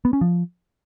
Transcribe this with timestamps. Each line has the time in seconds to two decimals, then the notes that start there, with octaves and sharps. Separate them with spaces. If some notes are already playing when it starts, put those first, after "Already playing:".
0.05 B3
0.13 C#4
0.21 F3